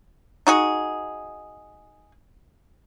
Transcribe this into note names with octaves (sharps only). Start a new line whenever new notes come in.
D#4 F#4 G#4